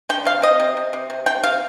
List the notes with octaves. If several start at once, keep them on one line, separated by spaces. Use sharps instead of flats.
D3 G5
C3 F5
C4 D#5
C3
C3
C3
C3
C3 G5
C3 F5